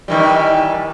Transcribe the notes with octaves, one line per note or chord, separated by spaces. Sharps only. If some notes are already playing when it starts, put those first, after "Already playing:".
D#3 E3 G3